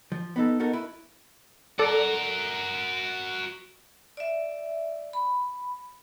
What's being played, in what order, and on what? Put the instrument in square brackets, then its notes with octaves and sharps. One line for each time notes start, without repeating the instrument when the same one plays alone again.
[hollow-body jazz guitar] F3
B3 D#4 A4
B3 D#4 F#4 A4 A#4
E4 B4
[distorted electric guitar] F#4 A#4 [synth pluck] A4 D5
[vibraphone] D5 E5
B5